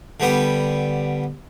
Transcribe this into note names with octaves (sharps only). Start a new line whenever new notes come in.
D3 G3 B3 G5